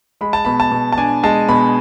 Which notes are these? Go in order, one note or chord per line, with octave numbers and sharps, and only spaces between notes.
G#3 B5
A5
B2 B5
A5
B2
A5
D4 G#5
G#3 A5
B2 B5